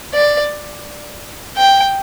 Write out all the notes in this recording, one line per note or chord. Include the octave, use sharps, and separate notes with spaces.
D5
G5